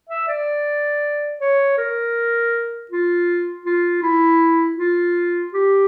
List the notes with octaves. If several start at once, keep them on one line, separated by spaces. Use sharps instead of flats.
E5
D5
C#5
A#4
F4
F4
E4
F4
G4